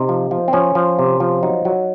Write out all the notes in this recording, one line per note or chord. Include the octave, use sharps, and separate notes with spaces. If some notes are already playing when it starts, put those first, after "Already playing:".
Already playing: C3 D#4
F3
F3
C4
F3 C#4
F3
C3
F3
F#3 D#4
F#3